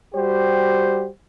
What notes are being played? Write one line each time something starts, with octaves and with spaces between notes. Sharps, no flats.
G3 F#4 G4 C5